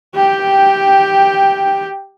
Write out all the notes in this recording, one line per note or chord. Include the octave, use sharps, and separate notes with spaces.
G4 G5